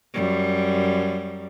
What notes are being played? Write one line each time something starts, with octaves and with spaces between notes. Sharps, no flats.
F#2 G3